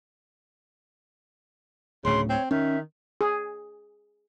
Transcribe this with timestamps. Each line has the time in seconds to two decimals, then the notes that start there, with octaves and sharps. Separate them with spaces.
2.05 D1 D2 A2 C#3 C6
2.29 C4 C#5
2.51 D#3 C#4 E5
3.21 G#4